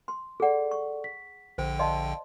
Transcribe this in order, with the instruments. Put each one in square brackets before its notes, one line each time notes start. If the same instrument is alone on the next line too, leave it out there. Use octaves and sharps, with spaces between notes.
[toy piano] C6
[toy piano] G#4 F#5 [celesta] A4 D5
[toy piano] C#6
[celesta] B6
[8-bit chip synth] A#1 D3 G5 [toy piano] C5
[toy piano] D5 D#5 C6 [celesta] F5 A5